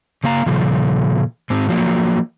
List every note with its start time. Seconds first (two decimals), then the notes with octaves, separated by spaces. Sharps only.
0.24 C#3 A#3 F5 A#5
0.46 A#2 C#3 F3
1.50 G#2 C4
1.69 F3 F#3 A#3